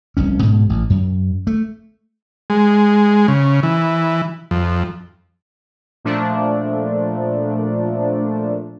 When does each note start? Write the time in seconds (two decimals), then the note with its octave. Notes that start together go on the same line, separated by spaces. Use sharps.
0.17 F1 C2 C#4
0.42 G#2 B2
0.69 A1
0.90 F#2
1.47 A3
2.50 G#3
3.28 C#3
3.63 E3
4.51 F2
6.05 A#2 F3 A3 D4